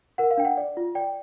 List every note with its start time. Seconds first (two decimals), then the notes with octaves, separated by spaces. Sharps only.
0.18 A#4 F#5
0.31 F5
0.37 D4 G5
0.45 F#5
0.57 D5
0.77 F4
0.95 D5 G5